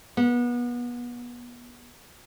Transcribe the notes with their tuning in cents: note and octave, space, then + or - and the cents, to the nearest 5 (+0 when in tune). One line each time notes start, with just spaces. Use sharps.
B3 -30